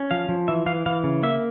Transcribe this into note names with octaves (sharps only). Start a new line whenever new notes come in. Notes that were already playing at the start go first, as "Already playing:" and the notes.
Already playing: C#4
F3 F5
F3
E3 E5
E3 F5
E3 F5
C#3
A#3 E5